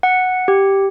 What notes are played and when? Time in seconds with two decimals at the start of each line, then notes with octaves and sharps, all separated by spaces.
0.03 F#5
0.48 G4